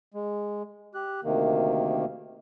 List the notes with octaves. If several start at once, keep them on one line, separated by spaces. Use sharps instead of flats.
G#3
G4 F#6
D2 C3 D#3 A#3